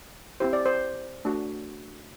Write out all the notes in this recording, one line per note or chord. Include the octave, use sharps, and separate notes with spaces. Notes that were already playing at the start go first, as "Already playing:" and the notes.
C4 E4 G4 C5
D5
C5
A3 D4 F#4